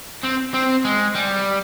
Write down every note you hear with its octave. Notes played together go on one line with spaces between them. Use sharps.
C4
C4
G#3
G3